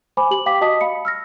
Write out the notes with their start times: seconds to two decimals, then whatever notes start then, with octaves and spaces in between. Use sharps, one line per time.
0.17 C5 G#5 B5 D6
0.31 G4 F#7
0.46 F5 G5 D6 B6
0.61 F#4 D#5 A5 D#6 B6
0.81 F5 B5 C#7
1.05 E6 F6 A#6